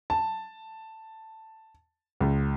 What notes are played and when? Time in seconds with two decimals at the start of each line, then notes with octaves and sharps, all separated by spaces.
0.10 A5
2.20 C#2